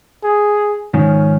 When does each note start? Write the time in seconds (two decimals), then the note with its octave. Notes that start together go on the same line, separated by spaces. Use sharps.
0.24 G#4
0.94 G#2 D#3 F3 C#4